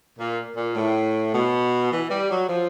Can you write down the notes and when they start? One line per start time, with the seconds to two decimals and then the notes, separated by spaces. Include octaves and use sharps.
0.18 A#2
0.56 A#2
0.75 A2
1.33 B2
1.91 E3
2.10 G3
2.30 F#3
2.48 F3